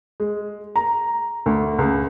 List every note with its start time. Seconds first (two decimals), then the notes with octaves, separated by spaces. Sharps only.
0.20 G#3
0.76 A#5
1.46 D2
1.78 C#2